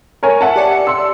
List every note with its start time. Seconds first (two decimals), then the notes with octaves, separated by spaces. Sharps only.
0.23 A#4 C#5 G#5
0.41 E5 F#5 A5
0.56 G4 D5 C#7
0.87 C6 E6